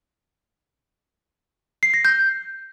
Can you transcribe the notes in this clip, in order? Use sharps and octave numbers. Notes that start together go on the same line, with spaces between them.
C7
A#6
G6